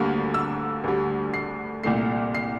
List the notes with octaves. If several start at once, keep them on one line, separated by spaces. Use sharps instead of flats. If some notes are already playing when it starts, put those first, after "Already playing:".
Already playing: D2 D3 G3 A#3 F6
E6
D2 D3 G3
C7
C2 A#2 A3 C7
C7